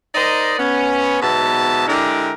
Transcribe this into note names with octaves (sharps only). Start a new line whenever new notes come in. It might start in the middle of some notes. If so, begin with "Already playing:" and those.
D#4 A#4 C5 D5 D#5
B3 C#4
G#2 B2 F#3 B3 E5 A5
D3 G#3 D4 E4 G4 A#4